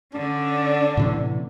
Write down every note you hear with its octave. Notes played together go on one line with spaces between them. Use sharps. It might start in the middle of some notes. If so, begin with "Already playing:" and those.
D3 C#4 D4
A2 C3 E3